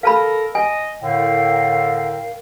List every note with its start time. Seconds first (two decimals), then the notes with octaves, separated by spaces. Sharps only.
0.03 A4 A#4 F5 A5 B5
0.55 D#5 G#5
1.02 A2 D3 A#4 F5 G5